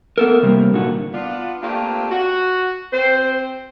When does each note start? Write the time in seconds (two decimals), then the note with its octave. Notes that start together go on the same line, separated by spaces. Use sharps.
0.18 B3 A4 A#4
0.43 C3 G3 A#3
0.74 A#2 D3 D#3 F#4
1.12 B3 D4 F4
1.62 A3 A#3 C4 D4 F4 G4
2.10 F#4
2.92 C4 C5